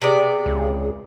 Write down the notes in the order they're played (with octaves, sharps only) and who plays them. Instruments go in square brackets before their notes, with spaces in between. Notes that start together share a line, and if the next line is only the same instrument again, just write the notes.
[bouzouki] C3 B3 D5 [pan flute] G#4
[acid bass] C#2